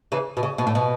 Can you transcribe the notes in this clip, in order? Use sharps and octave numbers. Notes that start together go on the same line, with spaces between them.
C#3 E3
B2
C#3
B2
A2
B2